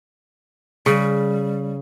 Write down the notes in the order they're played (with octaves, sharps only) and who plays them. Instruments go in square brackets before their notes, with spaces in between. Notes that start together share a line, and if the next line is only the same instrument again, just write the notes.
[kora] C#3 [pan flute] G3